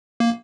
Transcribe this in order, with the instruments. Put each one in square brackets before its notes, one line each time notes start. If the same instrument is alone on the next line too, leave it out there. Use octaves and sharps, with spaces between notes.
[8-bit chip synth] A#3